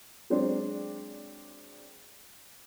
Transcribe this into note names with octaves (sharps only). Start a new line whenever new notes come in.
F#3 G#3 C4 D4 C5 D5